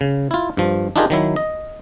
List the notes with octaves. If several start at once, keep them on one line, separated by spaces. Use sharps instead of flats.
C#3
E4 F4
G2 F3
D4 D#4 F4 G4 G#4 A#4
D#3 F#3 E4
D#5